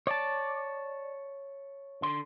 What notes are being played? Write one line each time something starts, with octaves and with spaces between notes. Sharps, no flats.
C#5 D5 A5
D3 C6